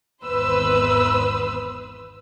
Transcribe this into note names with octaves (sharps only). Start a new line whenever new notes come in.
G#1 E2 B4 C5 E6